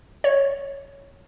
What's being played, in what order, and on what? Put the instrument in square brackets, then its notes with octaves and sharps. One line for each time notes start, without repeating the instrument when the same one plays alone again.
[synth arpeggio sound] C#5